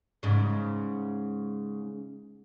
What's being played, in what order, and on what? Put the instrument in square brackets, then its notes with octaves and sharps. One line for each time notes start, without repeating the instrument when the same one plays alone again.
[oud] G#2 C#3